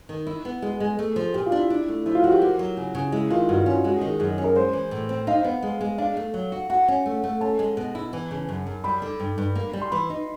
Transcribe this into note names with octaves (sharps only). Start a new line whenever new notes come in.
D#3
E4
B3
G#3 G#4
G#3
A3
F3
A#2 G4
F4
D4
E4
D4
A3
F3 E4
F4
F3 F#4
G4
A#3 F#4
F#3
C#3
C#3
G#3 E4
D#3 F4
G2 F#4
F4
C#4
F#4
G#3 F#4
G#4
D#3
G#4
F#2 G#4
G#4
C#4
A#4
G#3 C5
E3
A2
C4
D#4 F5
B3
G#3
G#3
D4 F5
A3
F#3
F#4
F#4 F#5
C#4
A3
A3
C#4 A5
G#3
B2
E4
E3
C#3
F#2
F#2
G3 B5
D3
G2
G2
A#3
G3
C6
E3 B5
D#4